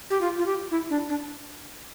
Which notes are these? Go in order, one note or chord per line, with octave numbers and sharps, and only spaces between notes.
G4
F4
F4
G4
E4
D4
D4